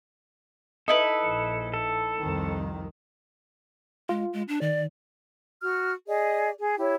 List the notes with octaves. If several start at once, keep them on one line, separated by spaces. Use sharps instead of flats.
D#4 E4 A4 B4
A#1
A4
C2 F2 D#3
G#3 F4
G#3
D4
D#3 D5
F#4 F6
G#4 D5 D#5
G#4
E4 G4 C#5